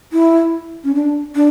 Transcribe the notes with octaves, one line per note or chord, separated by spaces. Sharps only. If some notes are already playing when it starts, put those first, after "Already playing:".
E4
C#4
D4
D4